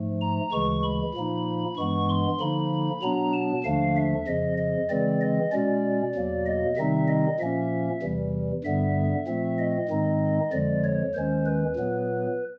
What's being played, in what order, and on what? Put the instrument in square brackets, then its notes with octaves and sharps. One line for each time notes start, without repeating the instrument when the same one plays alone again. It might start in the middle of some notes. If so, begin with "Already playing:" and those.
Already playing: [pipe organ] G#2 F3 A3
A#5
D2 C#3 E3 G#3 C#6
B5
A#2 F3 A#3 D#4
G2 E3 G#3 B3 C#6
C6
D3 F3 A#3 D#4 B5
B2 F#3 B3 D4 A#5
A5
D#2 D3 F3 A3 D4 F5
E5
F2 C#3 F3 D#5
D#5
C#3 E3 G#3 C4 D5
D#5
B2 G#3 C#4 D5
E2 B2 F#3 A#3
D#5
C3 D#3 G3 C4 D#4 E5
D#5
A#2 F3 A#3 C#4 E5
E2 C3 E3 G3
G2 D3 G3 B3 E5
A#2 F3 A3 C4
D#5
G#2 D#3 G#3 C4 D#4
F2 D3 F3 G#3 D5
C#5
D#2 D#3 G#3 C#4 C5
B4
A#2 F#3 B3